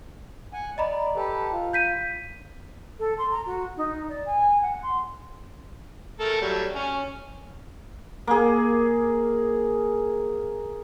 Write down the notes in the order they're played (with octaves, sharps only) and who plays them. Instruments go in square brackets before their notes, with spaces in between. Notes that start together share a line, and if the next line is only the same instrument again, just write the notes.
[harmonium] F#5 G#5
[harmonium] D5 [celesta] D#5 A#5 B5
[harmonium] G4 A4 B4
F4
[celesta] G6 B6 D#7
[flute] A4
C6
A#5
F#4
D#4
D5
G#5
F#5
C6
[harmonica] A3 A4 A#4
F#3 G3 A3
C#4
[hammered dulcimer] A#3 G#4